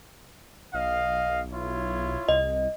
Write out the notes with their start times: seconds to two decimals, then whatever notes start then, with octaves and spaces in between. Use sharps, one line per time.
0.74 B1 D#5 F5
1.53 E4 F4 C#5
2.29 C2 D#5